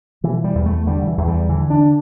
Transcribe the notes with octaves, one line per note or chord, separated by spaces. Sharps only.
B2 E3
G3
E2
A3
D3 G3
D3
E3
E2
G3
D3 E3
D4